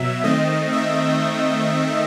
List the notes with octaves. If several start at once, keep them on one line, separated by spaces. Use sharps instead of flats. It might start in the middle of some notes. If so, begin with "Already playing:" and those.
Already playing: B2 F#3 E5
D#3 A3 C4 D#5
E5